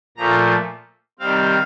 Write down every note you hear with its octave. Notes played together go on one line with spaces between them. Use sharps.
A#2 F3 A3 A#5
C3 D#3 G3 C4 F5